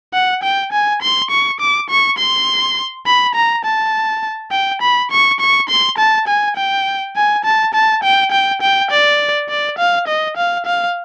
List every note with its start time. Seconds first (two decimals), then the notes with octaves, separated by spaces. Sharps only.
0.13 F#5
0.43 G5
0.72 G#5
1.02 C6
1.30 C#6
1.60 D6
1.90 C#6
2.18 C6
3.06 B5
3.35 A#5
3.65 A5
4.52 G5
4.82 B5
5.11 C#6
5.40 C#6
5.69 C6
5.98 A5
6.28 G#5
6.56 G5
7.16 G#5
7.44 A5
7.74 A5
8.03 G5
8.32 G5
8.62 G5
8.91 D5
9.49 D5
9.78 F5
10.07 D#5
10.37 F5
10.66 F5